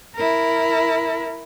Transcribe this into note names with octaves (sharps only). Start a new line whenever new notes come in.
E4 A#4